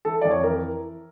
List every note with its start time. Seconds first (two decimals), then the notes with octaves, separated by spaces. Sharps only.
0.05 E3 A4
0.21 F2 D5
0.31 C#5
0.43 E3 A#4